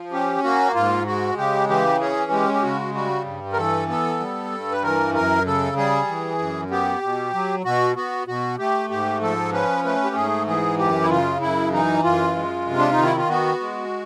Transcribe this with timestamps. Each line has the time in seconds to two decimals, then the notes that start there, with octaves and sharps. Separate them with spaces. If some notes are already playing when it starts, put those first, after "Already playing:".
Already playing: F3
0.12 C#4 G4
0.44 A#3 F#4
0.75 G#2 F4
1.06 G#3 F#4
1.38 C#3 G4
1.69 E3 G4
2.00 C#4 G#4
2.31 G#3 G4
2.53 G4
2.63 C#3 F#4
2.94 G3 F#4
3.26 G2
3.53 A#4
3.57 E3 A4
3.88 B3 A4
4.20 G3
4.52 G2
4.72 B4
4.83 E3 A#4
5.14 F#2 A#4
5.46 C#3 A4
5.77 G3 G#4
6.08 E3
6.39 F#2
6.70 B3 G4
7.02 B2
7.33 F#3
7.65 B2 F#4
7.96 B3 F#4
8.27 B2 F#4
8.58 A3 G4
8.90 G#2 G4
9.21 F3 A4
9.53 C#4 B4
9.84 A3 B4
10.04 G4
10.15 G#2 G#4
10.47 E3 G#4
10.78 F#2 G4
11.02 E4
11.10 C#3 F4
11.41 F#2 E4
11.73 E3 D#4
12.04 F#2 F4
12.35 G#3
12.66 C3
12.78 D4
12.91 D#4
12.98 D#3
13.03 E4
13.16 F4
13.29 B3 F#4
13.60 G#3